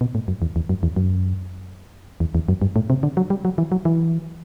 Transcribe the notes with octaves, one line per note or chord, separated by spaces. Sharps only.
B2
A2
F#2
E2
E2
F#2
E2
F#2
E2
E2
F#2
G2
A2
C3
D3
F#3
G3
F#3
E3
F#3
E3